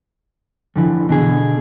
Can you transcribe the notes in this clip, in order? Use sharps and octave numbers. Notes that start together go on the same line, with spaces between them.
F2 D3 E3
B2 D3 G#4